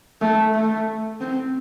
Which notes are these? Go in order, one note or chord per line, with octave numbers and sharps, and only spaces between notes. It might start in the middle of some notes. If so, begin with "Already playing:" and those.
A3
A3
C4